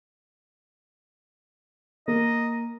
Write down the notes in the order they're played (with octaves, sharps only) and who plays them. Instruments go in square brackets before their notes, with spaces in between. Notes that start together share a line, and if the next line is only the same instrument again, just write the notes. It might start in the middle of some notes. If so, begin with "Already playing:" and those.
[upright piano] A#3 [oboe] D#5